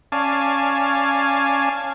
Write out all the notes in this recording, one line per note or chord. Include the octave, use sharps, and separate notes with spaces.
C#4 D5 F5 G#5 A5